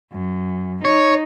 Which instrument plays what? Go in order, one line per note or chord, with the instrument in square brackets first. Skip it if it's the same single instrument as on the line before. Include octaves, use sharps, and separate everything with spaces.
[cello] F#2
[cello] D#4 [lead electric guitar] C#5